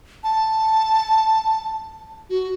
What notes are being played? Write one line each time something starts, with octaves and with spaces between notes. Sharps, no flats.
A5
F#4